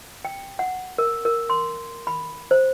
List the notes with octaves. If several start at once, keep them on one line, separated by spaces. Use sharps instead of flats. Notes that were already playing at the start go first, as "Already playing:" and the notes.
G5
F#5
A#4
A#4
C6
B5
C5